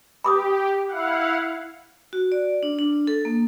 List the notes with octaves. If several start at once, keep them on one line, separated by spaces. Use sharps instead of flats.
G4 B5 D6 D#6
E4 F5 F#5
F#4
D5
D4
D4
A4
A#3